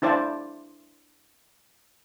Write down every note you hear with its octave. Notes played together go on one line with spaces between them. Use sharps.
D4 E4 C5 D5 F5 A5